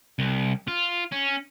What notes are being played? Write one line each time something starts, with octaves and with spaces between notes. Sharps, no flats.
C2
F4
C#4